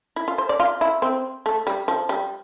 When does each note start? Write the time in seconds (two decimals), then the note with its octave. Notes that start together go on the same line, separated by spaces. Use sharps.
0.16 E4
0.28 F4
0.38 C5
0.49 D5
0.60 F4
0.81 E4
1.02 C4
1.46 A3
1.67 G3
1.88 F3
2.09 G3